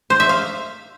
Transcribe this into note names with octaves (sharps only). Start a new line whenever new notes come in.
C5
E5
F5